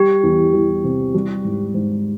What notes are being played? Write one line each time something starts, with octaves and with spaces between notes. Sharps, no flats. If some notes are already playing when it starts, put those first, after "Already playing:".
Already playing: G3 G4
E2
G3
C3
G3
G#2
G#2